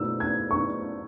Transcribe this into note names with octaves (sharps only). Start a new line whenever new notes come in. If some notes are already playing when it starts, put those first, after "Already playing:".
Already playing: B2 A3 E4 E6
G#6
C#6